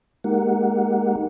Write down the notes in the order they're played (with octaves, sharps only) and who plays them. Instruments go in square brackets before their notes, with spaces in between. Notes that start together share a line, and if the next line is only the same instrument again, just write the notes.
[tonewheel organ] G#3 A#3 D#4 G4 A#4 F#5